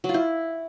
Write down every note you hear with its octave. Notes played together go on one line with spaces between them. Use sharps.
F#3
F4
E4